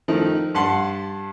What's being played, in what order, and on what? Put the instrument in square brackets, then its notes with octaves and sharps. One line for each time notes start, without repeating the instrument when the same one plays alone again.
[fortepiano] D#3 F3 A3
G2 F#5 A5 C6